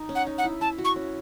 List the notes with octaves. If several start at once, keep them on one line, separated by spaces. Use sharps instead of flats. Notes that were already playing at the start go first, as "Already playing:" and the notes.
Already playing: D#4
C#4
F#5
D#4
F#5
E4
E4 A5
F#4
C#6
C#4